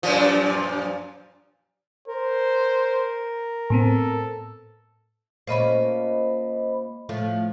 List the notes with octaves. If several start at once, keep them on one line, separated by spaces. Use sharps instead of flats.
F#2 A#2 F3
A#4 C5
A2 B3 C4 A4
A#2 A3 C#4 C5 D#5 B5
A2 F3 A3